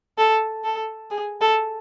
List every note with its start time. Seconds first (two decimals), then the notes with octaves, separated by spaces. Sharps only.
0.18 A4
0.64 A4
1.11 G#4
1.41 A4